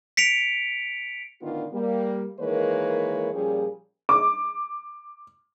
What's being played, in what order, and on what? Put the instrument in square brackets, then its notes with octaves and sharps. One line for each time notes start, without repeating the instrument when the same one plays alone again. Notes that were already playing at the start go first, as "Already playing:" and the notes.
[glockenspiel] B6 C#7 D7 F7
[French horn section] A2 D3 D#3 B3 D4 F4
G3 A#3
D#3 E3 G#3 A#3 B4 C#5
A#2 F3 G3 C#4 G#4
[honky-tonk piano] D6